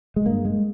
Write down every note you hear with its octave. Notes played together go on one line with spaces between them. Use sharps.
G#3
G2 A#3
G#3